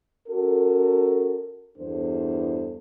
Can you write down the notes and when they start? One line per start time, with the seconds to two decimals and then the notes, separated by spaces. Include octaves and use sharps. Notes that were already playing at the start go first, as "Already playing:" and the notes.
0.28 C#4 F#4 A4 A#4
1.77 E2 G2 D4 A4 C5